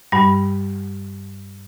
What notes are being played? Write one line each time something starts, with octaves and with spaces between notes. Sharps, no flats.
G2 G3